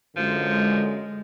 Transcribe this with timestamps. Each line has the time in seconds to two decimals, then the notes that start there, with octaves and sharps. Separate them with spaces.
0.16 F#2 D3 F3 G#3